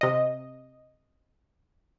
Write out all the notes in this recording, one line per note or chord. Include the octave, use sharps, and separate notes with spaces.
C3 D#5